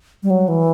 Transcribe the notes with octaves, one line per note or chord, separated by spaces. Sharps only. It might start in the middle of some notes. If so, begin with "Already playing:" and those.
G3
F#3
E3